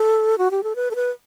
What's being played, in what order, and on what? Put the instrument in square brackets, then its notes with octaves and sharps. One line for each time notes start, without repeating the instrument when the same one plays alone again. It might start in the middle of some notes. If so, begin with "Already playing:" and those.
Already playing: [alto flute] A4
F#4
G4
A4
B4
A4
B4